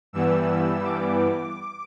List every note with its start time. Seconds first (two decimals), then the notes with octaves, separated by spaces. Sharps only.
0.13 G2 E3 G3 B3 E6
0.85 D6